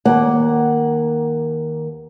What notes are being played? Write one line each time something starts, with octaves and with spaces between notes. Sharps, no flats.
D#2 A#3 F#5